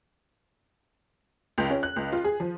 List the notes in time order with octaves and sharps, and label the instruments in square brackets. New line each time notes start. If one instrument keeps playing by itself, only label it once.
[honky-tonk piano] C#2
C#4
F#6
C#2
F4
G#4
F3